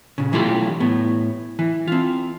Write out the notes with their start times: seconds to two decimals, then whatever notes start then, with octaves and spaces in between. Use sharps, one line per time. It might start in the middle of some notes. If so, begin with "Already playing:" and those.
0.18 A#2 C#3
0.32 B1 E3 A3 F4 G4 B5
0.80 A2 B3
1.59 E3
1.88 C4 F4